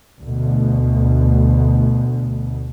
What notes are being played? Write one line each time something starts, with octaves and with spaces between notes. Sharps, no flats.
D2 B2